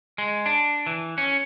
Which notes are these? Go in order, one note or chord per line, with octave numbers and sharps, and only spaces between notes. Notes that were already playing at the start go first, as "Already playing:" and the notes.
G#3
D4
E3
C#4